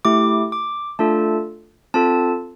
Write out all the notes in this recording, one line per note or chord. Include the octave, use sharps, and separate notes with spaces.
A3 E4 G4 D6
D6
A3 D4 F4 A4 A5
C4 F4 A4 A5